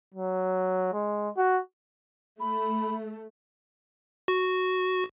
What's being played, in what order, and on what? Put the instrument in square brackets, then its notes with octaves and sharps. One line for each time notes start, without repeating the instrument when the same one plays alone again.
[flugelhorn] F#3
G#3
F#4
[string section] A3 [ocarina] B5
[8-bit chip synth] F#4